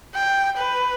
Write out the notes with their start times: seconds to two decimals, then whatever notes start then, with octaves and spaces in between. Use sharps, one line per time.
0.15 G5
0.56 B4